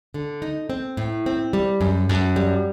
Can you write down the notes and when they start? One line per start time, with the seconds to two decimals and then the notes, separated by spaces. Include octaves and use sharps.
0.14 D3
0.42 D#4
0.70 C4
0.97 A2
1.26 C4
1.53 G3
1.81 F#2
2.09 F#2
2.36 G3